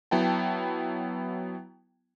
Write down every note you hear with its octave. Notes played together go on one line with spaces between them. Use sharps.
F#3 B3 E4 G5 A5